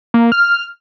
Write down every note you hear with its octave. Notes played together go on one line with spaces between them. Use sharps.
A#3
F6